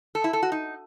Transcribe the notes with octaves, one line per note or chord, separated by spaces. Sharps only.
A4
E4
A4
F#4
D#4